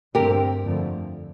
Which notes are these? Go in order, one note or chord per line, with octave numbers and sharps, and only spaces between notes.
G2 D3 A3 C4 G4 A#4
F2 D3 F3 A3